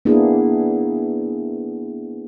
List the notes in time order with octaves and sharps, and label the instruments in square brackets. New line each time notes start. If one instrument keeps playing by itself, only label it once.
[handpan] A#3 B3 D4 E4 G#4